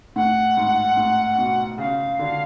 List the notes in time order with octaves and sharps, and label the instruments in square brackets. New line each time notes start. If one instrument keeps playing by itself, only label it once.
[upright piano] A2 [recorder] F#5
[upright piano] G#2
A2
B2
[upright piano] C#3 [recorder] F5
[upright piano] D3